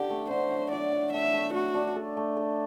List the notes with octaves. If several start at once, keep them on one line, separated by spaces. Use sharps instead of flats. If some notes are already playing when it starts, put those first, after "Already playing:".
Already playing: D3 G4
A3
D3 C5
F#3
F#3 D5
F#3
A3 E5
A3
A3 F#4
D4
A4
A3
A4